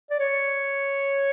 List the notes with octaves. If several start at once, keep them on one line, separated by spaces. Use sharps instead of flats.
D5
C#5